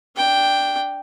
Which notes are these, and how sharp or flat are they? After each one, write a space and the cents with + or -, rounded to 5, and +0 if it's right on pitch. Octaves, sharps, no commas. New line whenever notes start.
D4 +0 G5 +0